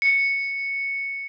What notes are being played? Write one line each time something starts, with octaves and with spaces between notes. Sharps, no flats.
C#7